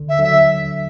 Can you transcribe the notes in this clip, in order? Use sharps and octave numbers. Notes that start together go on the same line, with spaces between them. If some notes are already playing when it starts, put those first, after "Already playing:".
Already playing: D3
E5
D3 F#3 E5